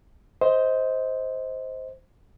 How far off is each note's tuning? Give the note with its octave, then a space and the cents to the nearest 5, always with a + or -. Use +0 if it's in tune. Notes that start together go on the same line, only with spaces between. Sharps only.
C5 +0 D#5 +25